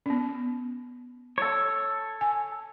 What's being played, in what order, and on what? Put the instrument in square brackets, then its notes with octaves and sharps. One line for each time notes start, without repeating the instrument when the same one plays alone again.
[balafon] B3 C#4
[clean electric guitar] A4 C#5
[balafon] G#5